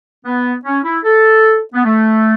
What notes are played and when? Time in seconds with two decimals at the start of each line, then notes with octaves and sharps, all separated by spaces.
0.25 B3
0.65 C#4
0.85 E4
1.04 A4
1.74 B3
1.85 A3